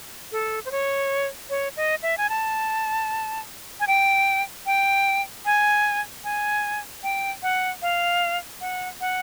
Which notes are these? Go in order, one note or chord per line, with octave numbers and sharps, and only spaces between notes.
A4
C5
C#5
C#5
D#5
E5
G#5
A5
G#5
G5
G5
G#5
G#5
G5
F#5
F5
F#5
F#5